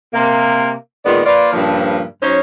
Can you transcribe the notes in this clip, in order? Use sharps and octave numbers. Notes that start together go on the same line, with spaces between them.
C3 A#3
A#2 D#3 G#3 B3 D5
A#3 F4 B4 D5
G2 A#2 C#3 F3
F#2 C#4 D#4 C5 C#5